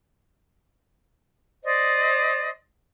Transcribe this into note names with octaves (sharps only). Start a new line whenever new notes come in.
C5 D5 D#5